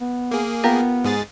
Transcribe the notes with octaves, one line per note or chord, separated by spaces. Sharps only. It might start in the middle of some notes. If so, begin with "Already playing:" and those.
B3
A#3 G#4
B3 F4 G4 A#4
G#2 G#4 A6